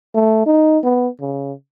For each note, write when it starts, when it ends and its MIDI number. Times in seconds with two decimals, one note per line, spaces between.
0.14 0.43 57
0.46 0.79 63
0.84 1.08 59
1.21 1.53 49